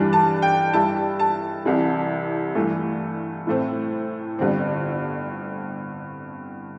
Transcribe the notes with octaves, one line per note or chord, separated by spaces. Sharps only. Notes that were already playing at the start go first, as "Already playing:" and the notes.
Already playing: G2 E3 G3 D4
A5
G5
G2 G3 E4 A5
A5
C2 C3 E3
G2 E3 A3
A2 A3 C4
G1 G2 D3 C4